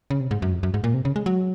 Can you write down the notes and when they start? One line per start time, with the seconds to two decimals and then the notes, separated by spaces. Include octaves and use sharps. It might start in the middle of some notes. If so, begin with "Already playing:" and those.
0.10 C#3
0.20 C3
0.31 G#2
0.42 F#2
0.52 F2
0.63 F#2
0.74 G#2
0.84 A#2
0.94 C3
1.05 C#3
1.16 G#3
1.26 F#3